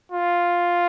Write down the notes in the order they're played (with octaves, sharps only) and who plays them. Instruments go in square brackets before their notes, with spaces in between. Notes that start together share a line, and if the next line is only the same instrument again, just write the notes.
[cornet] F4